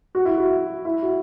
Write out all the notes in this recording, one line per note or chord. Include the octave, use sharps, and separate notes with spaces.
F#4
E4
F#4
E4
F#4